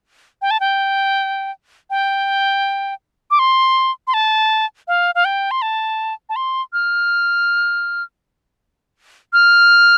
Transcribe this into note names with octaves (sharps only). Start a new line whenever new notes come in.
G5
A5
G5
G5
D6
C6
C6
A5
F5
F5
G5
C6
A5
A5
C6
F6
F6